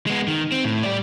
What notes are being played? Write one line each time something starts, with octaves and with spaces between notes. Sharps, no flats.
G#3 B3
D#3
C4
A2
G3 D5